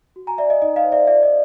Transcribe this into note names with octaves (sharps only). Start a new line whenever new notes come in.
F#4
G#5 A#5
D5 E5
D#5
D#4 D#5
D#5 F5
C5
D5 E5
F4 D5 E5
D#5